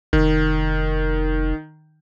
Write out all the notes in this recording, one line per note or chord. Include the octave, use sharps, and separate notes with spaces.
F1 D#3